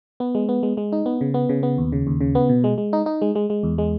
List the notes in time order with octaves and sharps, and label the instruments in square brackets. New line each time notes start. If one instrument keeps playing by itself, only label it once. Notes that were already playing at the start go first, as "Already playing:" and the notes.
[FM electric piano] B3
G#3
B3
G#3
G#3
D#4
B3
C#3
B3
C#3
B3
D#2
C#3
D#2
C#3
B3
B2
G#3
G#3
D#4
D#4
G#3
G#3
G#3
E2
G#3